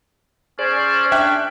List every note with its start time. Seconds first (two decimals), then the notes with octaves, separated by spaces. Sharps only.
0.59 C#4 G#4 C5 D5
1.12 D4 E5 G5 F#6